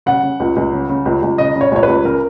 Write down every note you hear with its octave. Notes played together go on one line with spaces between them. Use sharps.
C#3 F#5
C#3
C#2
C#2
C#3
C#3
C#2
C#2
C#3 D#5
C#3
C#5
C#2 C#5
B4
C#2
C#3 A#4